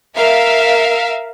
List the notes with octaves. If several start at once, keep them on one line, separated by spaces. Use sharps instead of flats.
A#4 E5 F5